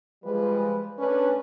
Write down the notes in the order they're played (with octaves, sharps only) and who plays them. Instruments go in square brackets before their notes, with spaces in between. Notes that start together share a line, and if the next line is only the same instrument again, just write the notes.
[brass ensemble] F3 G3 G#3 [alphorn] B4
[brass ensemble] A3 D4 B4 [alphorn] C#4